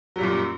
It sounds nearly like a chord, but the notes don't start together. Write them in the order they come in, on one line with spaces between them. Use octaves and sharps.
F#3 G3 A#2 F#2